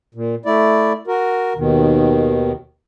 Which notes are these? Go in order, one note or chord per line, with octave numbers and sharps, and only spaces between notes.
A#2
A3 E4 D5
F#4 A#4
D#2 B2 D#3